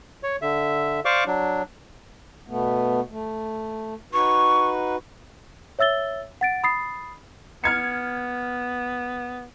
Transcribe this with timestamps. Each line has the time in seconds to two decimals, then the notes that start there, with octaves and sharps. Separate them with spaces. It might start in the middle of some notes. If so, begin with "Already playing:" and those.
0.23 C#5
0.42 D3 E5
1.05 C5 D5 F5 C#6 D6
1.27 F#3 D4
2.48 B2 A3 B3
3.10 A3
4.13 D#4 F#4 B4 C#6
5.79 C#5 E5 E6 A6 G7
6.41 F#5 A6 D7
6.64 B5 D#6 A6 C7
7.64 B3 F6 G#6 C#7